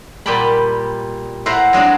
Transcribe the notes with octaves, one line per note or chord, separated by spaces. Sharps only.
A#2 G3 G4 G5 A5 B5
A2 C5 E5 F#5 A#5
F#3 G#3 C4 D4